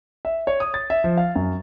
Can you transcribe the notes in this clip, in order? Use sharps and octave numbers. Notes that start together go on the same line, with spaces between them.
E5
C#5
D#6
A6
E5
F3
F5
F#2